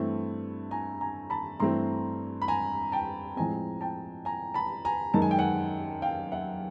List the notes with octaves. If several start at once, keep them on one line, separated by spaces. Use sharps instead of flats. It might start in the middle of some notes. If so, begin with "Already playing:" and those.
Already playing: G2 E3 A3 C4
G#5 A#5
G#5 A#5
A5 B5
G2 E3 A3 C4 A#5 C6
B5
G#5 A#5
G5 A5
A2 F3 G#3 C4 G#5 A#5
G5 A5
G#5 A#5
A5 B5
G#5 A#5
F#2 D#3 G#3 A5
G#5
G5
F#5 G#5
F5 G5
E5 F#5